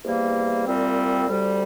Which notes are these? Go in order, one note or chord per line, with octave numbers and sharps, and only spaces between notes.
E2 C3 G3 A#3
C2 A#2 G3 C4
D2 C3 G3